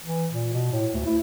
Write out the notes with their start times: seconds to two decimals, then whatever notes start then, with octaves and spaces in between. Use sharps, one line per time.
0.04 E3
0.31 A#2
0.53 B2
0.72 A2
0.94 D2
1.06 E4